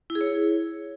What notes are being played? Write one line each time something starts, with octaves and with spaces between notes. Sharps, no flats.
E4
G#4
C#5